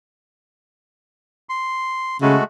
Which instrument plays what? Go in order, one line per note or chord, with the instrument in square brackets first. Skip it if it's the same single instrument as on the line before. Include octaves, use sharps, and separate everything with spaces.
[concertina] C6
[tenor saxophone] C#3 [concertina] G#3 A3 F#4